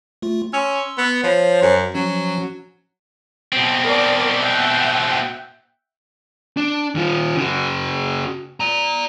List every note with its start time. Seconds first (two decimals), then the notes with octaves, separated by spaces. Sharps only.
0.22 A3 F4
0.53 C#4 C6 E6
0.98 B3
1.24 F3 C5 C#5
1.62 F#2
1.95 F3 F#3 C#4
3.53 B2 C4
3.83 A#4 D5
4.41 E5 F#5 G5
6.57 D4
6.95 D#3 F4
7.37 C#3 F#4
8.60 D5 A#5